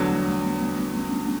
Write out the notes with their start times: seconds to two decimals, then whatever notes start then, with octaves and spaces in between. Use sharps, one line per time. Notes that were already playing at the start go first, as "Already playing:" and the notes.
Already playing: E2 D3 F#3 A3
0.08 G3
0.26 A3
0.43 B3
0.79 D4
0.96 C#4
1.14 A3